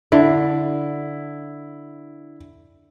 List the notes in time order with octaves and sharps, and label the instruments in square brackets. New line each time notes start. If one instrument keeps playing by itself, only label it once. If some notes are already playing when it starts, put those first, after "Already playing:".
[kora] D3 [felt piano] E4